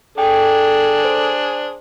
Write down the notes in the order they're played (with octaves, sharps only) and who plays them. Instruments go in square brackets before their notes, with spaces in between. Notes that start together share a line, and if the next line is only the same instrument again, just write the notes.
[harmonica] D4 G#4 [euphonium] A4 [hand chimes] G5
[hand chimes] C5